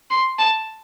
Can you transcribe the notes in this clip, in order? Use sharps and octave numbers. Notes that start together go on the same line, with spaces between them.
C6
A5